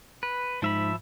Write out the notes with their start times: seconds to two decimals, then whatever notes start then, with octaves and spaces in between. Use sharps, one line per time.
0.23 B4
0.62 G#2 F3 E5 B5